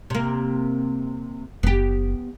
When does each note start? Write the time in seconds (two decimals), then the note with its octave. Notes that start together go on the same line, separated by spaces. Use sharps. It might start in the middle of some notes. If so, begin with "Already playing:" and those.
0.10 C3 A#3
1.63 F#1 B3 G4